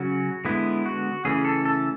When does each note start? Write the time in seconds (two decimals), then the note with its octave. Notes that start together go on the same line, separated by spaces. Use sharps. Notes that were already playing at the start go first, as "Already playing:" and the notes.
Already playing: C#3 F#3 C#4 F#4
0.45 D3 G#3 B3 E4
0.86 F#4
1.25 C#3 E3 A3 C#4 G#4
1.45 A4
1.65 A4